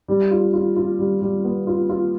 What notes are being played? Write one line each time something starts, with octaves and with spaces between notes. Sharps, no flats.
G3
F4
F4
F4
G3
G3
B3
F4
F4